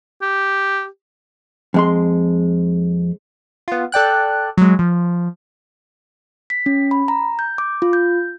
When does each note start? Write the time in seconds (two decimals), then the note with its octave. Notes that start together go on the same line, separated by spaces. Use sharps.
0.22 G4
1.74 F2 G#3 C6
3.68 B3 F4
3.92 A4 D5 G5 F#6
4.57 F#3 G#3
4.79 F3
6.50 B6
6.66 C#4
6.91 B5
7.08 A#5
7.39 G6
7.58 D6
7.82 F4
7.93 G6